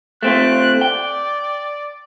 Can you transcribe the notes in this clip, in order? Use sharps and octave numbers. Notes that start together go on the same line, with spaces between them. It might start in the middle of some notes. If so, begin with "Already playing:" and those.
A3 C4 F4 F#6
D5 G5